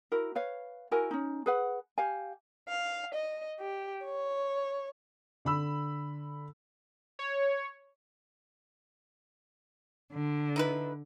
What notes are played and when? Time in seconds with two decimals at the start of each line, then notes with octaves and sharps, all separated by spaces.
0.12 E4 F#4 A#4
0.35 B4 C#5 F5
0.91 E4 F#4 A#4 G#5
1.11 C#4 D#4
1.46 G#4 B4 F#5
1.98 G4 F5 G#5
2.68 F5
3.14 D#5
3.59 G4
4.04 C#5
5.45 D3 B5 E6
7.19 C#5
10.11 D3
10.56 D#4 E4 B4